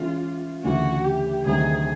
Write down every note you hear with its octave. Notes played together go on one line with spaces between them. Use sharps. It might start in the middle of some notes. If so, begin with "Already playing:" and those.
Already playing: E3 G#3 C#4 F4
D2 C#3 E3 F#4
G4
D2 C3 D#3 F#3 G#4